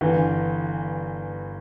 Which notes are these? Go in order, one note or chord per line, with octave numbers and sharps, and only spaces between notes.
G1 G2 E3